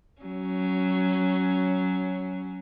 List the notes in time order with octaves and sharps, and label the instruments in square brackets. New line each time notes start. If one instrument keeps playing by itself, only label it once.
[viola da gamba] F#3 C#4